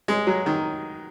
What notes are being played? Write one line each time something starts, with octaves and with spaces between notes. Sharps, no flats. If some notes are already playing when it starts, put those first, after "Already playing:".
G#3
F#3
D#3